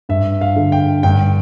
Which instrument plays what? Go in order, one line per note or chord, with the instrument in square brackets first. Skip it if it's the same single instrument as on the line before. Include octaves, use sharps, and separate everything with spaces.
[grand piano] G2 E5
F5
D3
G5
G2 G5